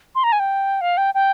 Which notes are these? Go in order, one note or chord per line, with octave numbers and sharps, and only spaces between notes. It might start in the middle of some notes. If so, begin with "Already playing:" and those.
C6
A#5
G#5
G5
F5
G5
G5